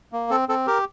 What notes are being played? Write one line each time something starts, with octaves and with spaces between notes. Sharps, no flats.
A#3
C4 A4
C4 A4
G4 A#4